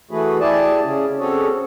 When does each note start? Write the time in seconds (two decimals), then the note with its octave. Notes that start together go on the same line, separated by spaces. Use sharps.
0.11 E3 A3 F#4 G#4 B4
0.40 E4 G4 G#4 D5 G#5 A5
0.84 C#3 C#4 G#4
1.19 C4 C#4 F#4 G#4 A4 C#5